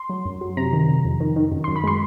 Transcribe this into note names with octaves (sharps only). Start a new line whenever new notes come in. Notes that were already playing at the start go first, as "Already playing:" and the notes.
Already playing: C6
F#3
F#2
F#3
C3 A#5
D#3
C3
F2
D#3
D#3
F#2
F#2 C6
B5
G#3 C6